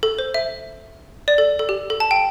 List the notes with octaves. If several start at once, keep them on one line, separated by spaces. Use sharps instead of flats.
A4
C5
E5
D5
A4
A4
G4
A4
A5
G5